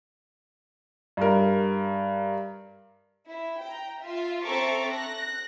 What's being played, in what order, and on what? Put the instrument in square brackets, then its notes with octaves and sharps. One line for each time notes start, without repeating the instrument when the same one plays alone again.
[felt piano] G2 A#4
[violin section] E4
G5 A#5
F4 E5
C4 A4 E5 A#5 C#6 D6
F#6 A#6